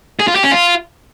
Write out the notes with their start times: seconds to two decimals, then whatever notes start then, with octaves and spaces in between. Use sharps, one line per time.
0.20 G#4
0.28 F4
0.36 G4
0.44 C#4
0.52 F4